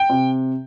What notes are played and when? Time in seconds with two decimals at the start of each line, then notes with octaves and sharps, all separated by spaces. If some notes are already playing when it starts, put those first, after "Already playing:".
Already playing: G5
0.10 C3